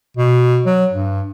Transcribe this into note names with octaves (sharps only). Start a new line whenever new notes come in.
B2
F#3
G2